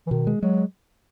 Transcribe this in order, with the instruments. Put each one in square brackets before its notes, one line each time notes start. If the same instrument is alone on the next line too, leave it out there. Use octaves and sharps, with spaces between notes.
[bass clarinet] E3
[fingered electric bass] B2 [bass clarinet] D#3
[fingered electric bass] G#3
[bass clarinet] F#3 [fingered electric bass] G#3